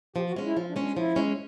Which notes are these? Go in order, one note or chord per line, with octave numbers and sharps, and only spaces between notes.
F3 G4
F#4
G#3 C#4
E4
F3 F4
D4
G#3 C#4
D4
F3 E4
G#3 C#4